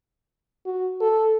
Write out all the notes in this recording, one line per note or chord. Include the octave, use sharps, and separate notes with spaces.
F#4
A4